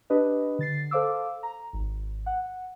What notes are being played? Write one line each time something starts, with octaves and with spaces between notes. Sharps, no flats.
D4 G4 B4 D#5
D3 A6 C7
A4 C5 F5 D6 E6
A#5
G#1
F#5